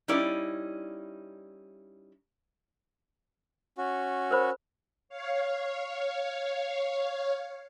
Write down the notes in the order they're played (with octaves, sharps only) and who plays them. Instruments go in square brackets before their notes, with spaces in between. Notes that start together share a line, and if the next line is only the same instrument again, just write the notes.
[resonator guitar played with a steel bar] G3 C#4 D#4 E4 D5
[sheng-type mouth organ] C#4 F#4
[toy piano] A#4 C5 B5
[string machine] C#5 F5